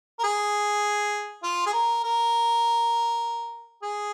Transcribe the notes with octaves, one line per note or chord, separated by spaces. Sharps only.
A#4
G#4
F4
G#4
A#4
A#4
G#4